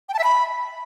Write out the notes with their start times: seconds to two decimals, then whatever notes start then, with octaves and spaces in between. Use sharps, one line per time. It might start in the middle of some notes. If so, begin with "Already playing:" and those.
0.09 G5
0.14 A5
0.19 E5
0.24 B5